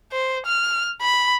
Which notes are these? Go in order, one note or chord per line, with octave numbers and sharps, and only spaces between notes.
C5
F6
B5